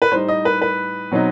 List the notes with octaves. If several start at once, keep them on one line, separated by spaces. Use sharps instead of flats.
B4
A2 G3 D#4 C5
D#5
B4
B4
B2 F#3 C4 D#4